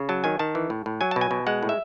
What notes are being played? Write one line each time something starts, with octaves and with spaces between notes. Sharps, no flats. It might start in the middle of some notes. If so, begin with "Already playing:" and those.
Already playing: C#3
F#3 A5
D#3 G#5
D#3 A5
E3
A2
A2
F#3 G#5
B2 A5
G#5
B2
G#3 F#5
A2
E5